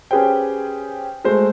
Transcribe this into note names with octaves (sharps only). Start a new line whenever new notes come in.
C#4 G4 G#4 B4 C5 G5
G#3 A3 C5